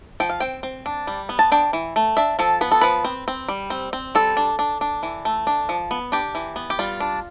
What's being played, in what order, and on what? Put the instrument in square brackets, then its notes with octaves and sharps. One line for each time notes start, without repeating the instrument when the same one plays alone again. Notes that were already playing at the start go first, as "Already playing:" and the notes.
[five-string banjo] F3 G5
F5
C4 G5
C4
D4
G3
B3
A5
D4 G5
E3
A3
D4 E5
F3 A4
B3 B4
A4
F3 B4
C4
C4
G3
C4
C4
G3 A4
D4
D4
D4
E3
A3
D4
F3
B3
D4 G4
E3
B3
G4
G3 F4
D4